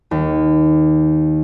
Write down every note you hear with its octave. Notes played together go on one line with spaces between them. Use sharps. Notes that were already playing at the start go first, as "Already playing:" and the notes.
D#2